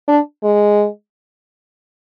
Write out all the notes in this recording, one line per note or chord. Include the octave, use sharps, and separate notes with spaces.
D4
G#3